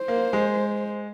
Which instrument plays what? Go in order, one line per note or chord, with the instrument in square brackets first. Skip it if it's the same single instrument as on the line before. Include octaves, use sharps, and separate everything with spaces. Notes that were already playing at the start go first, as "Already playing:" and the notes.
Already playing: [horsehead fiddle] C5
[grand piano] A#3
G#3